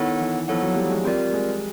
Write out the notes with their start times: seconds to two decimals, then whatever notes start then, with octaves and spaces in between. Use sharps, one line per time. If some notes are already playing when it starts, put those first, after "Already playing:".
Already playing: D#3 B3 E4 A4 C#5 F#5
0.19 E3
0.48 F3 B3 E4 A4 C#5 F#5
0.63 F#3
0.76 G3
0.90 G#3
1.04 G3 C4 F4 A#4 D5
1.33 G#3